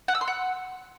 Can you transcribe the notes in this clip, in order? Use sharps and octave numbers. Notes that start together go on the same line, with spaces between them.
F#5
E6
C6
F#5